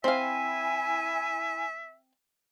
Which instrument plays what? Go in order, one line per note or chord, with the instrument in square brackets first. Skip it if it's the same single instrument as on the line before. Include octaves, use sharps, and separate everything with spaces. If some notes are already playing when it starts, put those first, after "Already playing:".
[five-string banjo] C4 F5 [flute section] E4 G#5 [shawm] E5